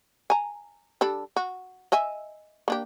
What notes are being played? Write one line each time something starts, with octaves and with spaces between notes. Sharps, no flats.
G#5 A#5
G3 D4 A4
F#4
D#5 E5 G#5
A#3 D4 G4